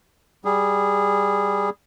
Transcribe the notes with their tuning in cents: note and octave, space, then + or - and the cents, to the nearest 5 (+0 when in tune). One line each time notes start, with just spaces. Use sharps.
G3 +0 G#4 -15